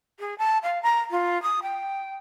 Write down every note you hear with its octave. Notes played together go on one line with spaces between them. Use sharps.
G#4
A5
F5
A#5
F4
D#6
G5